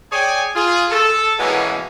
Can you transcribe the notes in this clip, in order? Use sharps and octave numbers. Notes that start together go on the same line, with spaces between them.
G#4 C#5 D5 G5 G#5
F4 G#4
A4
B2 E3 G#3 A#3 B3 C#4